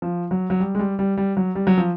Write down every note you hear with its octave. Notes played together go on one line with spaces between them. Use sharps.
F3
F#3
F#3
G3
G#3
G3
G3
G3
F#3
G3
F#3
F3